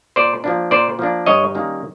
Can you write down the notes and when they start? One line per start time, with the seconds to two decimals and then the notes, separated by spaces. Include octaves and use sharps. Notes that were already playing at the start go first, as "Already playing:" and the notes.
0.16 A#2 C5 D5
0.44 F3 A#3 D4
0.71 A#2 C5 D5
0.99 F3 A#3 D4
1.26 G2 C#5 D#5
1.55 D#3 G3 A#3 C#4